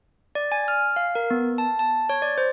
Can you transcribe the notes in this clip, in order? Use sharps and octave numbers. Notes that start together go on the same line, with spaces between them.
D5
G#5
F6
F5
A#4
B3
A5
A5
C#5
D5
C5